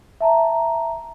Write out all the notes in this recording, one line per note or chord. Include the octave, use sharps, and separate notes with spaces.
E5 A5 A#5